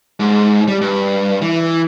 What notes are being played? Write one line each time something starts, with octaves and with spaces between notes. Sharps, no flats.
G#2
G3
G2
E3